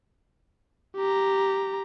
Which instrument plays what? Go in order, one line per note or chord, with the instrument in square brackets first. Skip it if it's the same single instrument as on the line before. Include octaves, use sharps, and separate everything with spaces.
[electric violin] G4 A#5